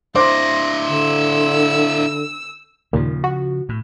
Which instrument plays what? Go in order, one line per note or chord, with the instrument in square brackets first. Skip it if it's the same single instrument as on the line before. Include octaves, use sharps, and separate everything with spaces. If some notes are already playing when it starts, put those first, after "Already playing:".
[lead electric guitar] D4 E4 [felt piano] C5 C6 D6 [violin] A#6
[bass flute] D3 [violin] E6
[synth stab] D#2 A#2 [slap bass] C#3 F3
[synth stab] F#4
[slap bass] A2